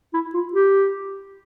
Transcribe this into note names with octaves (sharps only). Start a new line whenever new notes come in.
E4
F4
G4